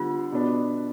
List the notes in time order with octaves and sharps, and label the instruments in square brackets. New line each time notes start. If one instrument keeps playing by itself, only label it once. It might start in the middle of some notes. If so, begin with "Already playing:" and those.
Already playing: [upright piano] D3 G3 B3 [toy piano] F4
[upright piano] B2 B3 D4